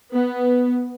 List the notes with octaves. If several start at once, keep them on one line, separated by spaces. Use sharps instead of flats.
B3